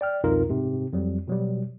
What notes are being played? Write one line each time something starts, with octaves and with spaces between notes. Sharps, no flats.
D5 G5 F6
C2 F2 B2 D#4 F4 A#4
G#2 C3
F2 F#3 G3
B2 F#3 G3